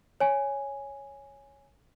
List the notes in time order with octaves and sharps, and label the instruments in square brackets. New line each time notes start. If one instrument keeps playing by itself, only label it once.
[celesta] C#5 G#5